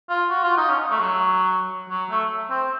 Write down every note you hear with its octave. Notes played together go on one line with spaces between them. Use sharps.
F4
F#4
F4
D#4
C#4
A3
F#3
F#3
A3
C4